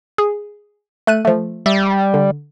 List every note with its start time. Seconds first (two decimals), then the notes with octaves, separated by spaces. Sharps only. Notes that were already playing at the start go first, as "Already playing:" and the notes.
0.18 G#4
1.07 A3 F#6 D#7
1.25 F3 A3
1.66 G3 D5 E5
2.14 D3